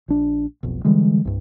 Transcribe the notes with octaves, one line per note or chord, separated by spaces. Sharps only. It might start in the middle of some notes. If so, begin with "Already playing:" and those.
A#1 D4
F1 B1
D3 E3 G3 G#3
C2 G2